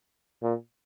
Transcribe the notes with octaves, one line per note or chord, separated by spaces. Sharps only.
A#2